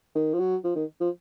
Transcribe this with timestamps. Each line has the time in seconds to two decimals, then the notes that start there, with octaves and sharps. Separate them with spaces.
0.15 D#3
0.34 F3
0.39 F#3
0.64 F3
0.76 D#3
1.01 F3